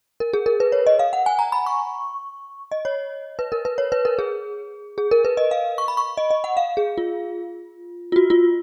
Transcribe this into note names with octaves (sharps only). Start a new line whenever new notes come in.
A#4
G#4
A#4
B4
C#5
D#5
F5
F#5
G#5
A#5
B5
C#6
D#5
C#5
B4
A#4
B4
C#5
B4
A#4
G#4
G#4
A#4
B4
D#5
F5
C#6
B5
C#6
D#5
D#5
F#5
F5
G#4
F4
F4
F#4
F4